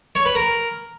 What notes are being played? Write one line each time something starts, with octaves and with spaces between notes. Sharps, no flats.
C#5
B4
A#4